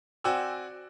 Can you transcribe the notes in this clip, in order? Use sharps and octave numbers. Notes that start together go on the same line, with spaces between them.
C4 F#4 D5 G5 G#5 E6